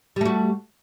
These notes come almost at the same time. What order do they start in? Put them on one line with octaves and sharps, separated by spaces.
G3 A3 F#4